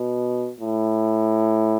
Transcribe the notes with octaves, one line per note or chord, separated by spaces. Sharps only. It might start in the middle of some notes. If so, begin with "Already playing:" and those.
Already playing: B2
A2